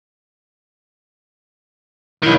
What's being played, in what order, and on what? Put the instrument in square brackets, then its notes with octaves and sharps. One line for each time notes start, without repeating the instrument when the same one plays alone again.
[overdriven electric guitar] B1 D#3 [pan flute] E4